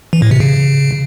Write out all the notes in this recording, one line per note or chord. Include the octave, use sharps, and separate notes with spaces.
E3
A2
C3
C#3